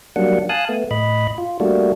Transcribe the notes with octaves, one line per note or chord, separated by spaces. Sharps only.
F#3 G3 A#3 D4 F#5
F5 G#5 A5 D#6 F#6
A3 B3
A2 D#5 B5
F4
G3 A3 A#3 D4 F#4